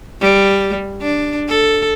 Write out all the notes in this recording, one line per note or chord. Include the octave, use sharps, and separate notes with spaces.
G3
D4
A4